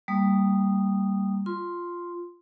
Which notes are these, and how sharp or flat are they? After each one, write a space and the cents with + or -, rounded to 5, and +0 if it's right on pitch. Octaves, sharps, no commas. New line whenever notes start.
G3 +0 A#3 -10 D#6 -10
F4 +0 C6 +0